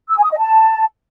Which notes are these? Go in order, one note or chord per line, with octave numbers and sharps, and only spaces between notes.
E6
G#5
D#6
D#5
A5